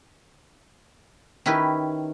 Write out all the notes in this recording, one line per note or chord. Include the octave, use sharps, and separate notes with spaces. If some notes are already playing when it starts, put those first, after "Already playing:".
D#3 C#4 E4 G4 B4